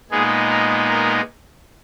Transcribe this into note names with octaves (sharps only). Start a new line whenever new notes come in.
A#2 G#3 B3 D#4 G#4
A#4
A#4